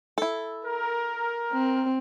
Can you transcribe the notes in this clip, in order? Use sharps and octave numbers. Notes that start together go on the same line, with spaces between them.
E4 A4
A#4
C4